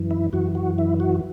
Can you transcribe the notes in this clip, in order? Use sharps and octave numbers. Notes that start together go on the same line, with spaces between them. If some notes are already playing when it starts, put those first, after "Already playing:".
Already playing: F#2 E3
E4
F#2 E3 F#4
F#4
E4
F#4